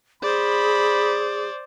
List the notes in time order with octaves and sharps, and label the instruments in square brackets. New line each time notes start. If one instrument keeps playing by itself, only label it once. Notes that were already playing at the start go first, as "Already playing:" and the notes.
[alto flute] G#4 [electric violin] C5 D5 [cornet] B5